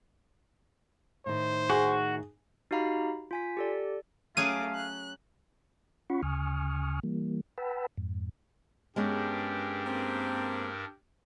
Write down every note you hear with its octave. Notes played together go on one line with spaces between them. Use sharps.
A2 D#3 C5
F#4 G#4
D#4 F#4 G4 F5 A#5 B5
F4 G#5 B6
G4 A4 D5
F#3 A3 C#4 G#4 F5 D6 D#7
F#6
C#4 F4 F#5 B5 C#6
D2 C#3 G#5 C#6 D#6 F6
E3 G3 A#3
B4 F#5 G5 A5 B5 E6
F2 G#2
G2 G#3 B3 C#4 D4 G4 A#4
A#3 C4